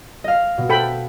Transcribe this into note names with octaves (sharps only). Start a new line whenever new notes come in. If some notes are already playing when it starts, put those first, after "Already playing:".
D#5 F5
B2
A4 G5 B5